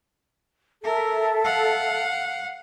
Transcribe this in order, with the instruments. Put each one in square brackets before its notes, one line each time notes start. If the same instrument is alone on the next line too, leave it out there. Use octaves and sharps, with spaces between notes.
[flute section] A4 E5 [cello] A#4
[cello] F5 F#5